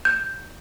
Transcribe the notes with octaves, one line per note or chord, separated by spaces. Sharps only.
G6